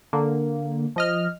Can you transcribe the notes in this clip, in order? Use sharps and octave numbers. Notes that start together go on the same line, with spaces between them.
D3 A#3
F3 D#5 F6